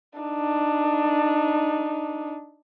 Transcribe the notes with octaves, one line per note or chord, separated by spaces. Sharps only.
D4 D#4